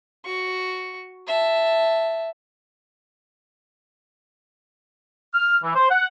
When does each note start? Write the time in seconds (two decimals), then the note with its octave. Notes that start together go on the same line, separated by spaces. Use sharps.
0.25 F#4 C#6
1.27 E5 A5
5.34 F6
5.63 E3
5.75 C5
5.90 F#5